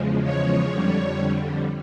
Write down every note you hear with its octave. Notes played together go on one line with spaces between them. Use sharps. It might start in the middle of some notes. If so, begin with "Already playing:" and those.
Already playing: E2 C#3 F3 G#3
C#5
F2 D3 G3